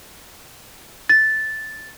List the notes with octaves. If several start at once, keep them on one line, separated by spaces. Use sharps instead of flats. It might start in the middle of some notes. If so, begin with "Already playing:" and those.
A6